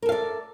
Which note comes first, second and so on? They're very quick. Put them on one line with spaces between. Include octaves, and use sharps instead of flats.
A#4 A4 F5 D5